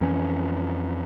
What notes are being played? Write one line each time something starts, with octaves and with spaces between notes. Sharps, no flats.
F2 E3 C#4